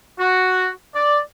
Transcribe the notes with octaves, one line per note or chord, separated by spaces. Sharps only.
F#4
D5